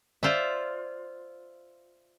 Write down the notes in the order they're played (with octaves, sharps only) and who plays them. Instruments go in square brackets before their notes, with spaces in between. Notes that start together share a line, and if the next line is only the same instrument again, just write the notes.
[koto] F4 C5 D5 E5